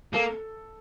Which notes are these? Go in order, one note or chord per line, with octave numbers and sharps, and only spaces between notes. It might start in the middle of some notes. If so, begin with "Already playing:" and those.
A#3 A4